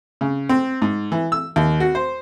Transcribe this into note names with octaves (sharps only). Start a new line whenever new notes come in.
C#3
C4
G#2
E3
E6
D#2
F#4
C5